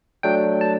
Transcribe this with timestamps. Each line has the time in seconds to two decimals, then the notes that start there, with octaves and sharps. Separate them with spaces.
0.23 F#3 A3 D4 G5
0.61 A5